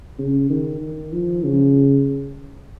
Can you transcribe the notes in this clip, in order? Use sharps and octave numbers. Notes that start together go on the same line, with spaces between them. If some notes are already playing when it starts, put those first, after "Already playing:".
C#3
D#3
D#3
F3
C#3